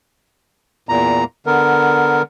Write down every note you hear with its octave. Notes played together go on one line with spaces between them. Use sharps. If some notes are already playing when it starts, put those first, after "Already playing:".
E2 A#2 A#5
D3 B3 A#4